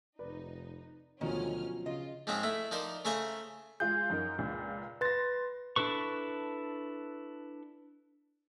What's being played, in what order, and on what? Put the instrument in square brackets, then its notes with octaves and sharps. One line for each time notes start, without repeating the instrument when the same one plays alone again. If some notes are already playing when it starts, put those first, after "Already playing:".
[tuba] F1 [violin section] D#4 [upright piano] B4 D5
[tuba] D2 [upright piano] B2 F3 F#3 [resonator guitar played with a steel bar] D#3 [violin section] C#4 F6
[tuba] C#3 [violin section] F4 [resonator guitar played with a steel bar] D#5
[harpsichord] G#2 F3 G#3 C4 C#4 G#4
A3 E4
F3 D#4 A#4 C5 D5
C#3 A3 C5 G#5 A#5 C#6
[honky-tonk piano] G#3 F4 G#4 [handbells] G6
[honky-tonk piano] F#2 D#4 A#4
C#2 A#2
[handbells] B4 A6 [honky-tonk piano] C6 A#6
[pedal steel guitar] D4 E4 A4 B4 C#6